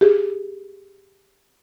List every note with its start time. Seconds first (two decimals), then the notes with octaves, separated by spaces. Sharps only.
0.01 G4 G#4